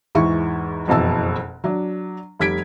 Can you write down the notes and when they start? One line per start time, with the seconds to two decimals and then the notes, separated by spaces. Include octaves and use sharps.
0.15 E2 G#2 E3 E4 C#6
0.88 F#1 F2 B2 E3 A5 E6
1.64 F#3 D4
2.40 F1 G3 G#6 B6 D7